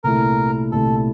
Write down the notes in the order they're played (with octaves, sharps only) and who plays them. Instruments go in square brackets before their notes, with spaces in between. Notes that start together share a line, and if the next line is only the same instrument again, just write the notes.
[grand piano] C2 A#2 A3 E4 [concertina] A#4
[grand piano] C2 A#2 A3 E4 [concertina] A4